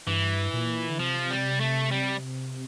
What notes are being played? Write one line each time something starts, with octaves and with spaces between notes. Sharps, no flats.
G2 E3
A#2
D3
C3 F3
G3
A3
G3